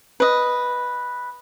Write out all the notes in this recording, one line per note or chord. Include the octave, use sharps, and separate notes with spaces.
B4 D#5